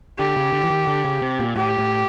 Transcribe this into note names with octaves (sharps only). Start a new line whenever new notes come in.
D3 G4
C#3
D3
E3
D#3
D3
C#3
C3
A#2
A2 G4
A2